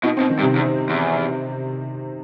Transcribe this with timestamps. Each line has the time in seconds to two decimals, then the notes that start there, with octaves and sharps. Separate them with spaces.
0.04 B2 D#4
0.17 C4
0.20 B2
0.30 D#3
0.39 G2
0.43 C3
0.55 E2
0.90 E2